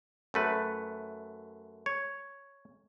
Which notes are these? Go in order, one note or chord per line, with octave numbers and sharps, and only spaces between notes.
F#2 A3 B4
C#5